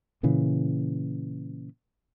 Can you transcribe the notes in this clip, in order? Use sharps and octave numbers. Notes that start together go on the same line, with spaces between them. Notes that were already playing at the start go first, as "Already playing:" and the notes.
A#2 C#3 E3